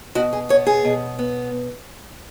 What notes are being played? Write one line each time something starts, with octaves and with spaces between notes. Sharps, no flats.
B2 F#4
G#4
B3 C#5
G#4
B2
B3